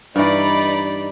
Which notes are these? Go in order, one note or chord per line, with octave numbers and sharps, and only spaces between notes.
G2 E3 D#4 D5 B5